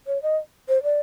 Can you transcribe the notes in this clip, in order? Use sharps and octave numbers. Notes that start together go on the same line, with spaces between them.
C#5
D#5
C5
D5